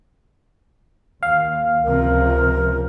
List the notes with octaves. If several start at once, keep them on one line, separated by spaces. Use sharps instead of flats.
D#2 F5
C#2 C3 F3 A#4